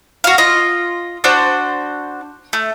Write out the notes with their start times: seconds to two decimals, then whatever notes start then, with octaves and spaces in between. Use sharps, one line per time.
0.24 F#4 F5
0.38 F4 D#5
1.24 D4 F#4 C5
2.53 A3